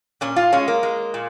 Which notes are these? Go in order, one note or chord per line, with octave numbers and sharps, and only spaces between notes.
A#2 C#4
F4
G#3 C#4
A#3
G#3
A#2